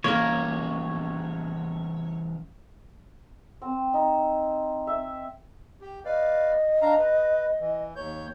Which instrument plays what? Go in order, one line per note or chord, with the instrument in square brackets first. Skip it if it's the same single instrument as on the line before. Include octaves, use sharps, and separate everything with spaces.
[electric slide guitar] E3 G3 C#4 [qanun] A#3 A#4 [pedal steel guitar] C#5
[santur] C4
D#4
E5
[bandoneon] G4
[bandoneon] B4 D5 F5 [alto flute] D#5
[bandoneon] D4 F5 A#5
B4
E3
D#2 C#5 G6